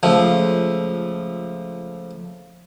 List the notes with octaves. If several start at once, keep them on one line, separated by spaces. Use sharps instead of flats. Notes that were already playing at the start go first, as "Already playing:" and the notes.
C#2 F3 A3